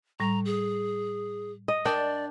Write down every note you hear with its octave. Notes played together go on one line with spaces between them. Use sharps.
A2 G3 A#5
G#4
D#5
D4 A#4 D5 G5